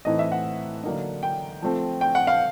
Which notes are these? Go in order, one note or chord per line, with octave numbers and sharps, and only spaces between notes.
A2 E3 A3 C4 D#4 D#5
E5
F#5
D3 F#3 A#3 D#4
G5
F3 A3 C4
G5
F#5
F5